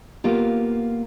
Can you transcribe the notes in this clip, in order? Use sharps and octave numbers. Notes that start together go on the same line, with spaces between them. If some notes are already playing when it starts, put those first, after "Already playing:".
A#3 B3 F4 G4